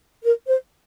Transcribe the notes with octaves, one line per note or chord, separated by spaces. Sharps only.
A#4
C5